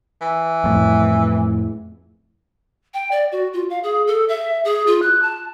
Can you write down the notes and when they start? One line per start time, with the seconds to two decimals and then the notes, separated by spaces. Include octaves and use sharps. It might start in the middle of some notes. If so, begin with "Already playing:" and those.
0.21 E3
0.64 F2 A2
2.94 G5
3.11 D5
3.32 F#4
3.53 F4
3.70 F5
3.84 G#4
4.07 A4
4.29 E5
4.65 G#4
4.87 F4
5.02 F#6
5.22 A5